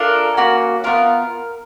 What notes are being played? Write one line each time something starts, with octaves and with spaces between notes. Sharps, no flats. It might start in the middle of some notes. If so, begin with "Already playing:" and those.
Already playing: D4 F4 A4 A#4
A#3 C#4 F#4
B3 D4 F4 A#4